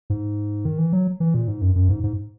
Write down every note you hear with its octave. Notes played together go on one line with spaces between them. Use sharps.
G#2
D#3
E3
F#3
E3
A#2
G#2
F#2
F#2
G#2
G#2